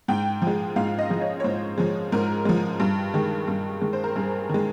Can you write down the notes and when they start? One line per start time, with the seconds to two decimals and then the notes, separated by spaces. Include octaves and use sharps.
0.08 G#2 G5
0.42 F3
0.47 G#3
0.76 G#2 F5
0.99 D#5
1.10 F3 G#3
1.21 C#5
1.40 C#5
1.44 G#2 C5
1.78 F3 G#3
2.12 G#2 A#4
2.45 F3 G#3
2.80 G2
3.14 D#3 G#3
3.47 G2
3.81 D#3 G#3
3.93 C5
4.04 A#4
4.16 G2 G#4
4.49 D#3 G#3